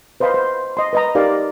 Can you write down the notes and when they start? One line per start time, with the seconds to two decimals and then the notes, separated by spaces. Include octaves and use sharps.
0.20 B4 C5 D#5 F5 B5 C6
0.34 C5
0.77 D#5 C6
0.93 B4 D#5 A#5
1.15 D#4 G4 A#4 D5 F5